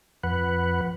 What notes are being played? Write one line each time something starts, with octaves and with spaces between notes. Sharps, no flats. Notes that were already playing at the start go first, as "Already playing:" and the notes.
F2 B4 F#5